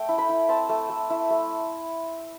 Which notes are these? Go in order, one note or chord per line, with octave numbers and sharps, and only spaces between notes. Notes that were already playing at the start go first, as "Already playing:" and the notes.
Already playing: A3 G5 A5
E4
B5
E4
C4 A5
A3
A3
E4
A3